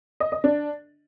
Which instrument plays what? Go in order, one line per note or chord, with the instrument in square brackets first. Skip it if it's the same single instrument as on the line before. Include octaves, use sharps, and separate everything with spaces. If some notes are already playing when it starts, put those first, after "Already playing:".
[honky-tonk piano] D#5
D#5
D4